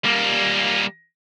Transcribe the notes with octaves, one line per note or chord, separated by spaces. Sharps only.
G3 A#3